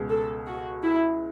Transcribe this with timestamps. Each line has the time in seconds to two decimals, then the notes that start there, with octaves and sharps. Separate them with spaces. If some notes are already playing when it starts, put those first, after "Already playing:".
Already playing: C#2 B2 G#3
0.10 A4
0.47 F#4
0.84 E4